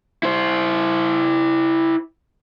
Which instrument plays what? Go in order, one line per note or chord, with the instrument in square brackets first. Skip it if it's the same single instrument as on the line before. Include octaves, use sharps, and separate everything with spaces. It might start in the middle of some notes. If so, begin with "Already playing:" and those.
[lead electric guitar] E4 C5